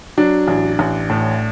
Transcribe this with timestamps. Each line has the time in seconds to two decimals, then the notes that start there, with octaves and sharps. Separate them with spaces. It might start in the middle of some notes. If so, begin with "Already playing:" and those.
0.18 F#3 D4
0.48 A1
0.79 A1
1.10 A2